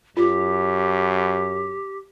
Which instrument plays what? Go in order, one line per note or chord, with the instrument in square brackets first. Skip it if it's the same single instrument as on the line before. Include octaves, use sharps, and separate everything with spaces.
[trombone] F#2 [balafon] F4 [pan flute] G4